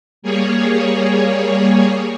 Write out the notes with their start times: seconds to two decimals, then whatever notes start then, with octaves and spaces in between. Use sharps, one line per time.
0.22 G3 A#3 G#4 C#5